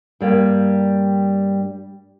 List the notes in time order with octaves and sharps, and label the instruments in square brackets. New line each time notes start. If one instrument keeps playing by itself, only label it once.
[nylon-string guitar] G2 G3 A#3